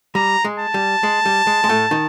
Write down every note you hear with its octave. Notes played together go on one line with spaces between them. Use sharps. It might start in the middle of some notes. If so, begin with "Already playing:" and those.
G3 A#5
G#3
A5
G3
G#3
G3
G#3
G#3
A2 A3
D#3 D#4